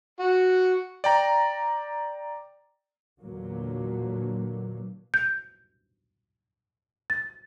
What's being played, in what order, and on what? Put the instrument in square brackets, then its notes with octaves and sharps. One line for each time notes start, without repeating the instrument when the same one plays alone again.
[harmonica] F#4
[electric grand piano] D5 G5 A#5
[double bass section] E2 A#2 D3 F#3 A#3
[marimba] G6
A6